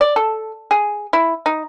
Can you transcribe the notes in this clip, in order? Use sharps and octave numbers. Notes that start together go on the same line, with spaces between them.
D5
A4
G#4
E4
D#4